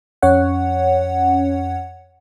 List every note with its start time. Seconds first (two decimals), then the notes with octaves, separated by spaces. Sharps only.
0.22 F2 C#4 C#5 F#5